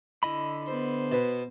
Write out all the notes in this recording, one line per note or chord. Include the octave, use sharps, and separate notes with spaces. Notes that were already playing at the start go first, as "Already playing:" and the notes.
D3 E4 D#5 B5
B3 C5
B2 B4